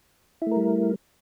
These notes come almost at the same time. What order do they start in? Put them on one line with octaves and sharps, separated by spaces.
E4 A3 A#4 G3